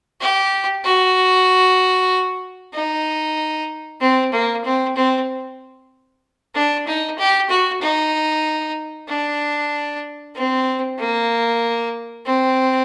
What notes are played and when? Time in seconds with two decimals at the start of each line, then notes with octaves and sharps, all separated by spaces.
0.21 G4
0.84 F#4
2.74 D#4
4.01 C4
4.33 A#3
4.64 C4
4.96 C4
6.55 D4
6.87 D#4
7.18 G4
7.49 F#4
7.81 D#4
9.08 D4
10.35 C4
10.98 A#3
12.25 C4